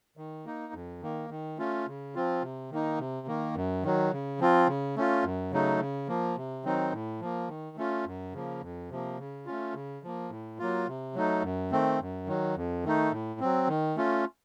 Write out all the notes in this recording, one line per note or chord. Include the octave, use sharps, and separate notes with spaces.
D#3
A#3 D#4
F2
D#3 A#3
D#3
A3 C#4 F4
C#3
F3 C4 F4
C3
D#3 A#3 D#4
C3
D#3 A#3
F#2
D#3 F#3
C#3
F3 C4 F4
C#3
A3 C#4 F4
F#2
C#3 F#3 A3 D#4
C#3
F3 A#3
C3
D#3 F#3 C4 D#4
A2
F3 A#3
D#3
A3 C#4 F4
F#2
C#3 F3 A#3
F2
C3 F3 A#3
C#3
A3 C#4 F4
C#3
F3 A#3
A2
F#3 A#3 F4
C3
F#3 A3 D#4
F#2
D#3 A3 C4
F#2
D#3 F#3
F2
D#3 A3 D#4
A2
F#3 C4
D#3
A3 C#4 F4